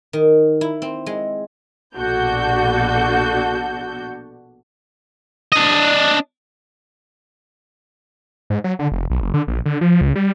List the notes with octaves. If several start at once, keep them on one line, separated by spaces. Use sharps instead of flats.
D#3
E4
C4
G#3
A#1 B2 D4 F#4 A4 G6
D4 D#5
G#2
F#3
D3
F1
B1
F#1
D3
A#1
D3
F3
C#2
G3